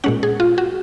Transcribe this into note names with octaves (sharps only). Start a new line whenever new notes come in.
A#2 G#3 C#4 F#5
G#4
F4
F#4